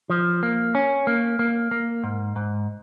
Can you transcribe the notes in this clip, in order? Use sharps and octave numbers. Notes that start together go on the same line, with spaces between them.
F3
A#3
C#4
A#3
A#3
A#3
G#2
G#2